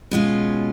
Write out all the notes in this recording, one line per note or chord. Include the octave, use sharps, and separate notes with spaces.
B2 G#3 C#4 F4